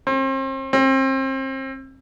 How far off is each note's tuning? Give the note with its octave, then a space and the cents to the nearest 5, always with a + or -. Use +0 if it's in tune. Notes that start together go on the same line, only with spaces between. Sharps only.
C4 +40
C4 +35